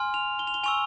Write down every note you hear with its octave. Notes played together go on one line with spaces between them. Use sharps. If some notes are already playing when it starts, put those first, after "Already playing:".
Already playing: G#5 C6 F6
F7
G7
F7
G7
G#5 C#6 E6 F7